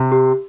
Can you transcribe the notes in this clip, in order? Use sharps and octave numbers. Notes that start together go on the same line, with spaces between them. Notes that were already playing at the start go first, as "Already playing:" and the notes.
Already playing: C3
G4